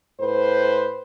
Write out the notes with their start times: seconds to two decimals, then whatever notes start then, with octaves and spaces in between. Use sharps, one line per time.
0.20 A2 B4 C5